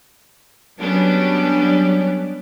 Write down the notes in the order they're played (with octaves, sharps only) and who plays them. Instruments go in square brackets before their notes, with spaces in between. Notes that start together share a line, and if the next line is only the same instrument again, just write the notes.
[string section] F#3 G3 B3 C#4 D4